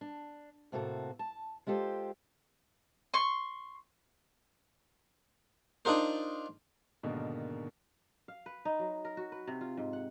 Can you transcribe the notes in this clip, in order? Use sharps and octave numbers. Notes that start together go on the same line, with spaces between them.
D4
A2 C3 A#3 F#4 A4
A5
G#3 F4 G4 A4 C5
C6 C#6
D4 D#4 F4 A#4 C5
G#2 B2 D3 D#3 G#3 A#3
F5
B4
D#4
F#3
A#4
F#4
B4
C3
F4
G#2
F#5